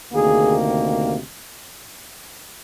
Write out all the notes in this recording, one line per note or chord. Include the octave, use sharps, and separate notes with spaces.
D2 C3 D#3 A#3 G#4